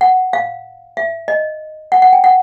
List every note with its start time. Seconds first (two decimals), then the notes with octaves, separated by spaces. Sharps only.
0.01 F#5
0.33 F5
0.97 E5
1.28 D#5
1.92 F#5
2.02 F#5
2.13 G5
2.24 F#5